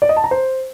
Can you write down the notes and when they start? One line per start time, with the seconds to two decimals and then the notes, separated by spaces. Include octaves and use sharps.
0.02 D5
0.09 D#5
0.16 A5
0.24 A#5
0.31 C5